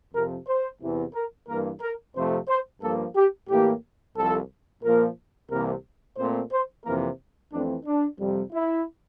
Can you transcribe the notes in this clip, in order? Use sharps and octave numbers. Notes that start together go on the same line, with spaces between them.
F2 C3 F3 A#4
C5
E2 C3 E3
A#4
G2 E3 A#3 A#4
A#4
F2 C3 F3 A3 C5
C5
G2 F3 A#3 A4
G4
A2 E3 A#3 G4
C2 C3 F3 A4
A#2 F3 A#3 A#4
C2 C3 E3 A#3 A#4
A#2 A3 C4 C5
C5
F2 C3 E3 A#3 A#4
F2 E3 A3 C4 D4
D4
F2 C3 G3
E4